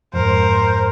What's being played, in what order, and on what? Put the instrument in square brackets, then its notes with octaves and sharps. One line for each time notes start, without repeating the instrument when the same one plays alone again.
[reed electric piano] F2 G#2 [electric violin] A#4 C5